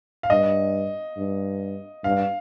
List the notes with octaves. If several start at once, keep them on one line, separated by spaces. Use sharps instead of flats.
F5
G2 D#5
G2
G2 F5